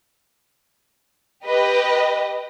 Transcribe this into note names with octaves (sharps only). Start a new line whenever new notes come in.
G4 B4 D#5